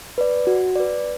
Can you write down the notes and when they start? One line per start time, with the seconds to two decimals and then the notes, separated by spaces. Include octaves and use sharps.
0.18 B4 D5
0.47 F#4
0.76 B4 D5